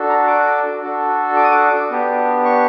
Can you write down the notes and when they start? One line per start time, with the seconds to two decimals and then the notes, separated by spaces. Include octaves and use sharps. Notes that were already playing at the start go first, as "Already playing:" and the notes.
Already playing: D4 F#4 A4
0.09 A#5
0.27 D6
0.82 D4 F#4 A4
1.36 D6
1.44 D#6
1.51 D6
1.91 B3 D4 G4
2.45 C#6